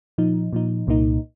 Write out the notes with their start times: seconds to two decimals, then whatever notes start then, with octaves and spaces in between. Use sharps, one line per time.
0.18 A#2 F3 D#4
0.53 A#2 F3 D#4
0.87 C2 A#2 A#3 D#4